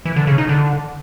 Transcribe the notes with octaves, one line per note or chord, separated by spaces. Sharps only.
E3
D3
C#3
D#4
D3